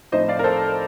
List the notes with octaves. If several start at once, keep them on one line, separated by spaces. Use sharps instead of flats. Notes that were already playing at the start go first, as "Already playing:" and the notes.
A2 F3 C4 D#4 C5 D#5
D5 F5
A#4
A4 C5